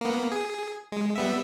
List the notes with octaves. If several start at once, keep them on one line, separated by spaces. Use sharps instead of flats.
A#3 B3
G#4
G#3
G3 B3 E5